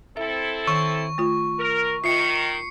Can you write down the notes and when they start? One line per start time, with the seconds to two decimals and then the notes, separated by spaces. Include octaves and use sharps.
0.17 C4 E4 A4 E5
0.67 D#3 C#6
1.18 A3 F4
1.59 A#4
2.04 D#3 F4 E5 C7 C#7